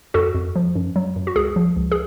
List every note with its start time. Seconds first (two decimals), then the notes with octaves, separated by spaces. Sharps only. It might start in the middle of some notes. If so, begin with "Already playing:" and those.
0.14 F2 F#4 A4
0.35 F2
0.56 F3
0.75 F#2
0.96 F#3
1.16 F#2
1.27 F#4
1.36 C#2 G#4
1.56 F3
1.76 C#2
1.92 G#4